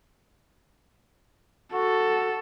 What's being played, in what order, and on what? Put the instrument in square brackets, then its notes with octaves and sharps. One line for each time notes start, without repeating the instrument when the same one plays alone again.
[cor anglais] F#4 [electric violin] A4